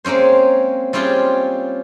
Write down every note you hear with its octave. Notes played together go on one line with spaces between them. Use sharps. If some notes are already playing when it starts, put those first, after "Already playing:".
G#3 A#3 C4 C#4 C5
G3 C4 C#4 F4 G4 G#4